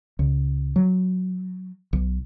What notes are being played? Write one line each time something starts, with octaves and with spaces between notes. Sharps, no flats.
C#2
F#3
B1